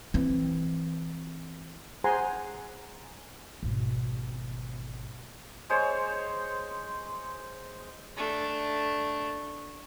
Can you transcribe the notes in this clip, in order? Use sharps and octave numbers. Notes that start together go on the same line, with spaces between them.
E3 C4
G#4 C5 F#5 G#5 A#5 C6
G#1 B2
G#3 C5 C#5
A3 D4